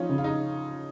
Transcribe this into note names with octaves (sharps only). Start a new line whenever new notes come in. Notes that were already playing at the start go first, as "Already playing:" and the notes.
Already playing: F3 C#4 D#4 F4
C#3
F4
D#4